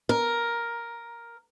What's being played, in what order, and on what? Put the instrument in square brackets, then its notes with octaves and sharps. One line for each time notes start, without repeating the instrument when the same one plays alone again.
[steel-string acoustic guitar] A#4